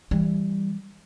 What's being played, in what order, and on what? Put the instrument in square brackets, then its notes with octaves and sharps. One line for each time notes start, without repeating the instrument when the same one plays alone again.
[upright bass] E3 G3